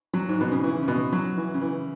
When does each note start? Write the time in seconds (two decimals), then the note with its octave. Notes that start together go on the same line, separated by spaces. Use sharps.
0.14 F#3
0.29 G#2
0.41 B2
0.52 C#3
0.64 E3
0.83 C#3
0.88 B2
1.12 F#3
1.37 E3
1.54 C#3
1.61 E3